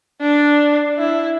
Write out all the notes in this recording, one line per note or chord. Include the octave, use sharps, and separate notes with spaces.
D4
E4